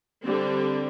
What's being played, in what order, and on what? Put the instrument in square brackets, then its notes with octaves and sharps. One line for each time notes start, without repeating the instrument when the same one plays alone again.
[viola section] D3 G3 C4